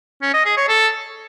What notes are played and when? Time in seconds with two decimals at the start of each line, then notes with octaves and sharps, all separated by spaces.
0.22 C#4
0.34 D#5
0.45 G#4
0.57 C#5
0.69 A4